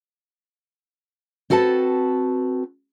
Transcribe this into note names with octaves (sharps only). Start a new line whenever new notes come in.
C4 F#4 A4 B4 A5